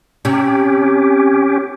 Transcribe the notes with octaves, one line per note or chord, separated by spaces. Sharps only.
C3 C#4 G4